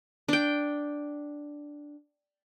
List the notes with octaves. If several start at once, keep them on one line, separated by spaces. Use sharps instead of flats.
D4 G5